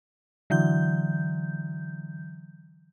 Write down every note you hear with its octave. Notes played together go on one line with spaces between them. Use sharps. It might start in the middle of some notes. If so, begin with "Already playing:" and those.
D3 E3 F#3 G6